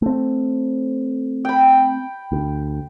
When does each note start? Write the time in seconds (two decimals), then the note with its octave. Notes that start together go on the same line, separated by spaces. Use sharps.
0.02 A3 C4
1.45 G5 B5
2.32 D2